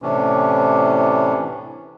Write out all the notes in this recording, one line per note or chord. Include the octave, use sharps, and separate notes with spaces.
A2 C3 E3 C#4 D4